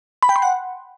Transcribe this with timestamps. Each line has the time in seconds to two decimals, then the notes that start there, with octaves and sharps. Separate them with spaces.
0.23 B5
0.29 G5
0.36 C6
0.42 F#5